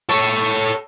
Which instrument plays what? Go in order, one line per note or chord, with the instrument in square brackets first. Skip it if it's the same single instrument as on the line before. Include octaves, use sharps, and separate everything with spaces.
[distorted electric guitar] A4 C#5